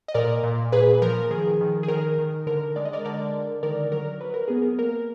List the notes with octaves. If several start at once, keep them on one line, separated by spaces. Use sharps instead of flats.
D#5
A#2 A#4 D5
A#2
A#2 G#4 B4
F3 A#4
D#3 G#4
D#3
G#4
D#3 A#4
D#3
D3 A#4
G#3 D5
D#5
A#4 D5
D3 A#4 D5
D3
D#3 A#4 D5
F#3 A#4
F#3 B4
A#4
B3 G#4
A#4
A#3 A#4